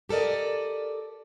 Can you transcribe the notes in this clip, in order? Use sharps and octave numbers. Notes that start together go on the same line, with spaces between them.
G4 A4 A#4 D5 D#5